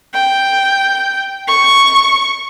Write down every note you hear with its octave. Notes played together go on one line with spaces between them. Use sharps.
G5
C#6